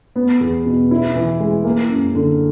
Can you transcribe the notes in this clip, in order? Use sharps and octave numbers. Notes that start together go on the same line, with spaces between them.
B3
E2
B2
E4
E3
G#3
A#3
F#2
D3